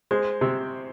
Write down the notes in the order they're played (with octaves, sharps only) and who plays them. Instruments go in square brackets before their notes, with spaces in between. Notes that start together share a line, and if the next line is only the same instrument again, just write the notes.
[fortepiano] G#3 [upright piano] C5
[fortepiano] C3